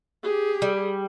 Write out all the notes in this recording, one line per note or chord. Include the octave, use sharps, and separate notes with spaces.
G4 G#4
G3